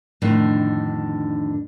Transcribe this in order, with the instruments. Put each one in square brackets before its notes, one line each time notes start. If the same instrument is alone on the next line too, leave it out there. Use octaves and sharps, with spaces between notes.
[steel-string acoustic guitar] F2 A2 D3 D#3 D4